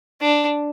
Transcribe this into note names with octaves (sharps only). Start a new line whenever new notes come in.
D4